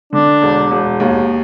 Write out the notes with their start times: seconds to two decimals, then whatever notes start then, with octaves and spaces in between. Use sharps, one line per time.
0.13 D3 D4
0.42 E1
0.71 E1
1.00 D#2